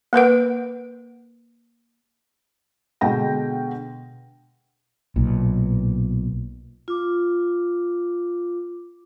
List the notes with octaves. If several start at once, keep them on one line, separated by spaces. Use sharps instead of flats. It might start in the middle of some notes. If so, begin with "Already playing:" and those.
A#3 A#4 B4 F#5
B2 D3 G#3 G5 A#6
B1 A#2
F4 D6